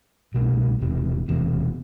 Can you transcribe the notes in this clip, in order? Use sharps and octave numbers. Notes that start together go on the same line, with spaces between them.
C2 B2 A3
E1 E2 C3
E1 E2 C3